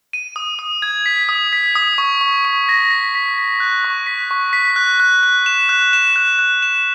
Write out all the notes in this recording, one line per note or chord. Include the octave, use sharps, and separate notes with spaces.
D#7
D#6
D#6
G#6
B6
D#6
B6
D#6
C#6
C#6
C#6
A#6
B6
B6
B6
F#6
C#6
B6
C#6
B6
F#6
F#6
F#6
E7
F#6
E7
F#6
F#6
E7